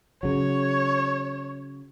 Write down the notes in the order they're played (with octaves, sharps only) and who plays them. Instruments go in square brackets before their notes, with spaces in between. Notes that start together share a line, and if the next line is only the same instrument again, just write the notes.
[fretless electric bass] C#3 F#3 [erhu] C#5